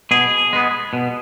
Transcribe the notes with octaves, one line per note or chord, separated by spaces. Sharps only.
B2 G#4
G#3 B3
B2